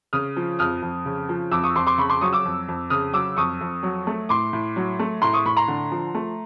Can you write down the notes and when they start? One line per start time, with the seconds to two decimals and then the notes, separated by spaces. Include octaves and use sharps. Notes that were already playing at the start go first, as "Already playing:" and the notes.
0.13 C#3 D#6 F6
0.37 F3
0.59 F2 D#6 F6
0.82 F2
1.05 C#3
1.29 F3
1.52 F2 D6 E6
1.63 C#6 D#6
1.76 F2 C6 D6
1.87 C6 D6
1.98 C#3 B5 C#6
2.10 C6 D6
2.21 F#3 C#6 D#6
2.33 D6 E6
2.45 F2
2.68 F2
2.90 C#3 D#6 F6
3.13 F#3 D6 E6
3.37 F2 C#6 D#6
3.61 F2
3.83 F#3
4.07 A3
4.29 A2 C6 D6
4.53 A2
4.76 F#3
4.99 A3
5.22 A2 A#5 C6
5.33 C#6 D#6
5.46 A2 B5 C#6
5.57 A#5 C6
5.68 D3
5.92 F3
6.15 A3